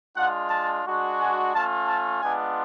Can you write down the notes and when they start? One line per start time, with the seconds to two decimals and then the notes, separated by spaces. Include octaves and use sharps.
0.16 G#3 D4 F4 F#5
0.51 A5
0.85 G#3 D4 F#4
1.19 G#5
1.54 A3 C#4 F4 A5
1.88 A5
2.22 G#3 B3 D4 F4 G#5